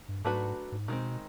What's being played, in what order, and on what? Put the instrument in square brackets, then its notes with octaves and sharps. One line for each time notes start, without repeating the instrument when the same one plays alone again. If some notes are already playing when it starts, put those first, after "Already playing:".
[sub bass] G2
[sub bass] G#2 [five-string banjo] F#3 A3 D4 F#4 B4
[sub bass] G#2
[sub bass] B2 [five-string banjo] D#3 G#3 C4